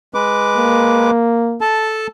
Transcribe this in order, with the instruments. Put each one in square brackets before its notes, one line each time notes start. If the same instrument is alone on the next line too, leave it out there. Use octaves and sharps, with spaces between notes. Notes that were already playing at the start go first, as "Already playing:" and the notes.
[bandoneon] G#3 B4 D6
[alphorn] A#3
[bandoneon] A4 A5